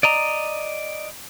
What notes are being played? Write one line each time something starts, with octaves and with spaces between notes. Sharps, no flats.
D5 D#5 A#5